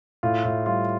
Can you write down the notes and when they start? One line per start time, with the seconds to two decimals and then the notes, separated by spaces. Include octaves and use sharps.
0.23 A2 F4
0.45 A2
0.66 G3 F4